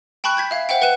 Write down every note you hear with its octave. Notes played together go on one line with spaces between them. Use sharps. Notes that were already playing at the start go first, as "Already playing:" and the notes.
G5 A5 B5 C#6 F#6
G6 G#6 B6
E5 F5
C5 E5 F#5 G5
B4 F#5 F#6 D#7 E7